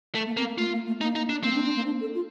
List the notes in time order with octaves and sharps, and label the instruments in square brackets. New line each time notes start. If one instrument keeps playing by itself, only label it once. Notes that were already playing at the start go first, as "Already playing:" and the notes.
[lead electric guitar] A3
[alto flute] A#3
[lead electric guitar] A#3 [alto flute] C4
[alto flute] A#3
[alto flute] A3 [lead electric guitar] F4
[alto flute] A#3
A3
[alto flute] A#3 [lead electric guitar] D#4
[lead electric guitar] D#4
D4
[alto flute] A#3 [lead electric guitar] C4
[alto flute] D4
D4
A#3
D4
A4
F4